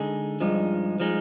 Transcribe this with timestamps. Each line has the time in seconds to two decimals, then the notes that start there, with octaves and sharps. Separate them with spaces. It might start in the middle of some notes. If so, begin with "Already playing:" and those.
Already playing: D3 G#3 D#4 G#4
0.40 G2 F3 G#3 D#4
1.00 F3 G#3 D#4